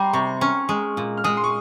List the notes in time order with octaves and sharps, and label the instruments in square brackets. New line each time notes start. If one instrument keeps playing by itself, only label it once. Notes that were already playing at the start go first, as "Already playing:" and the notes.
Already playing: [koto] G3 [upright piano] A#5 C6
[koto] C3 [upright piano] C#6
[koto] C#4 [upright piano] F6
[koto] G#3
A#2
[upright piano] F6
[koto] G#3 [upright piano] D#6
[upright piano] C6
C#6